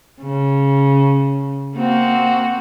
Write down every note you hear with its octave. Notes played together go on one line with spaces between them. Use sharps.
C#3
A#3 C4 F#4